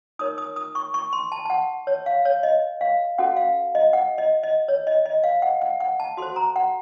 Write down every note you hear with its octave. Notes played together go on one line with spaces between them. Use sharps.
D#4 A#4 C#5 D#6
D#6
D#6
C#6
C#6
C6
A5
A5
F#5
C#5
F5
C#5
D#5
F5
C#4 F#4 A4 F#5
F5
D#5
F#5
D#5
D#5
C#5
D#5
D#5
F5
F#5
F#5
F#5
A5
F#4 A4 C5 C6
A#5
F#5